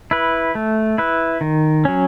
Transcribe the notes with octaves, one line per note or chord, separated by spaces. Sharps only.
E4 B4
A3
E4 B4
D#3
F#3 C#4